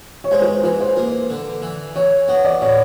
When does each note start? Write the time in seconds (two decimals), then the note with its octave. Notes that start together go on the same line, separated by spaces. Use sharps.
0.24 C#5
0.31 G#3 C5
0.42 B4
0.47 C5
0.63 E3 B4
0.81 C5
0.97 A#3 B4
1.30 D3
1.62 E3
1.95 E3 C#5
2.28 B3 C#5
2.44 D5
2.61 A2 C#5